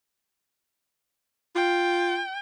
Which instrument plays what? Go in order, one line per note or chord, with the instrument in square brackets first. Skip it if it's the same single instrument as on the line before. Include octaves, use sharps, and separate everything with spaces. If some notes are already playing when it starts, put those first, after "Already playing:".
[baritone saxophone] F4 [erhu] G5